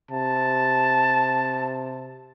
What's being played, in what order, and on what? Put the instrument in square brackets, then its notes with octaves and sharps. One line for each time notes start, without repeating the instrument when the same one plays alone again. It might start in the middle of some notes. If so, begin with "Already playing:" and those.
[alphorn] C3 [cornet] A5